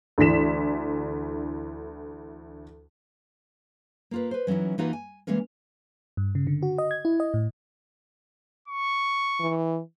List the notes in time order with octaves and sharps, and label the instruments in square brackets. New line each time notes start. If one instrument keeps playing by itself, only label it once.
[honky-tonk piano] D2 D3 E3 B6 E7
[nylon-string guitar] A#3 F4 B4
B4 C5
E3 F#3 C#4 D#4 E4
E3 A#3 D#4 F4 F#4 B4
G#5
E3 G#3 A#3 C#4 A#4
[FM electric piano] G2
C#3
D3
F#4
D#5
G#6
E4
D#5
A2
[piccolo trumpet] C#6
[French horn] E3